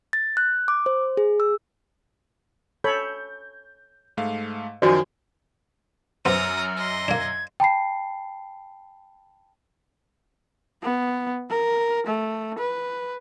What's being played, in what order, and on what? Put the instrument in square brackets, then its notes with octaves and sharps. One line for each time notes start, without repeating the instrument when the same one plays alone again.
[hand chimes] A6
F#6
D6
C5
G#4
E6
[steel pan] A4 C#5 B5 [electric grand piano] G6
[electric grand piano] G#2 A3 F5
[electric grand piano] F#2 D#3 F3 [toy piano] F#4 D5 [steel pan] C5 G#5
[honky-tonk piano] F#2 [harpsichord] B3 C5 [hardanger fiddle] A#5 D#6 [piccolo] F6
[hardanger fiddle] D#5 C6
[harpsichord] A#3 D4 [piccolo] G#6
[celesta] G5 A5 B5 C7
[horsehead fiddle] B3
A#4
A3
B4